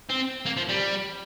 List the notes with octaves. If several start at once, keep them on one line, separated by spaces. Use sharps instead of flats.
C4
A#3
F3
G3